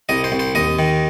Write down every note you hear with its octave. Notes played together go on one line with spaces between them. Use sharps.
C2 D#5
C5
C2
C5
D#2 D#5
D#3